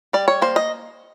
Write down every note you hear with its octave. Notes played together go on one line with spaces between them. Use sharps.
G3 D5
C#5
A#3 C5
D#5